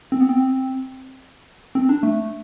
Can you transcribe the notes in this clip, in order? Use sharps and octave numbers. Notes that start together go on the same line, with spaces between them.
C4
B3
C4
C4
D4
A3